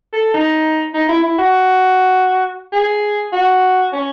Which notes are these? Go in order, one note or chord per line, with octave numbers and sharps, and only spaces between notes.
A4
D#4
D#4
E4
E4
F#4
G#4
F#4
C#4